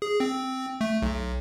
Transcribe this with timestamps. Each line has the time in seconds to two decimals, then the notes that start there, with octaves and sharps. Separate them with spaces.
0.02 G#4
0.20 C4
0.81 A3
1.02 B1